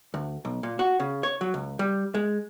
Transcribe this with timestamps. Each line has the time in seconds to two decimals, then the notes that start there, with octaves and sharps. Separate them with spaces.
0.14 D2
0.45 B1
0.63 A#2
0.79 F#4
1.00 C#3
1.23 C#5
1.41 F#3
1.54 C#2
1.79 G3
2.15 G#3